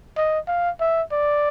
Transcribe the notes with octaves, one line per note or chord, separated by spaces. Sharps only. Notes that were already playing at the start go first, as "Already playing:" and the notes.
D#5
F5
E5
D5